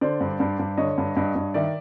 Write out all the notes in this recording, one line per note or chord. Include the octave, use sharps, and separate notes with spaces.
D3 C5 D5
G2
G2
G2
D3 C#5 D#5
G2
G2
G2
D#3 D5 E5